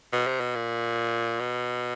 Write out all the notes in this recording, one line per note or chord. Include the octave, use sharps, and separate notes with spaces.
B2
C3
B2
A#2
B2